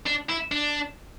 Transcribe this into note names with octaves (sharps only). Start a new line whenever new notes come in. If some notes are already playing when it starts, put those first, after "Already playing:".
D4
E4
D4